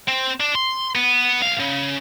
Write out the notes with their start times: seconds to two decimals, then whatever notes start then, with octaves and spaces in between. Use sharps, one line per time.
0.08 C4
0.40 D4
0.55 C6
0.95 B3
1.40 B1 F5
1.60 C#3